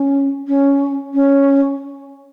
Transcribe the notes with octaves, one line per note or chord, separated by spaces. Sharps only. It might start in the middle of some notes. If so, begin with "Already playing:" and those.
Already playing: C#4
C#4
C#4